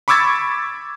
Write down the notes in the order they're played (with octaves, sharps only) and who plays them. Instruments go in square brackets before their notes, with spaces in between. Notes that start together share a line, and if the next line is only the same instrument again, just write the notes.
[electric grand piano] B5 C#6 D6 E6 G#6 A6